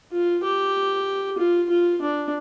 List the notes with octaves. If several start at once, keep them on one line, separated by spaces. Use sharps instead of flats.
F4
G4
F4
F4
D4